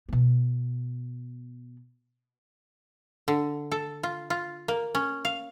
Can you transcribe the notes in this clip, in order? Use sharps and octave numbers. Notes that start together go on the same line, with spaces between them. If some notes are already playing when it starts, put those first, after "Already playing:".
B2 B3
D3
A4
F4
F4
A#3
C#4
F5